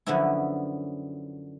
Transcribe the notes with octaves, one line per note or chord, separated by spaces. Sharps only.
F#2 D3 F3 B3 C#4 E4